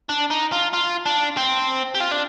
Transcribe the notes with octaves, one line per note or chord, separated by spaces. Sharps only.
D4
D#4
F4
F4
D4
C4
G4
F4
D4